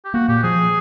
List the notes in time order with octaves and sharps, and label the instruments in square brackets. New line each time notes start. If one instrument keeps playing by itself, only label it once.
[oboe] G4
[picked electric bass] A#3 [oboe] F#4
[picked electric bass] A#2 [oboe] G4
[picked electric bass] F3 [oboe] G#4